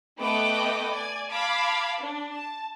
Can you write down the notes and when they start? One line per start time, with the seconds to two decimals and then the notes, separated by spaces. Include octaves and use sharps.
0.18 A3 B3 B4 D#5 G5 D6
0.93 D5 G#5
1.30 F5 A5 B5 D6 G#6 B6
2.00 D4
2.32 A5